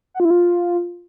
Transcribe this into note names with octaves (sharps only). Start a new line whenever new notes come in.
F#5
F4
E4
F4